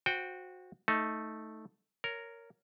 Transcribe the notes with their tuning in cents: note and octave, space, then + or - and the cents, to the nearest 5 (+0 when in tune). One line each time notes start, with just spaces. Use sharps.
F#4 -15 C5 +0 G5 +0
A3 +0 D#4 +15
A#4 -5 C#5 +15